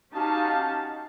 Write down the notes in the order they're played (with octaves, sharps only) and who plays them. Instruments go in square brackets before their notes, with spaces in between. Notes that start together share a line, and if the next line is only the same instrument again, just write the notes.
[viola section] C#4 D#4 F#4 G4 F5 A5